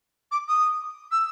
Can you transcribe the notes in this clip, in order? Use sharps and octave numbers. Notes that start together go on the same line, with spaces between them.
D6
D#6
E6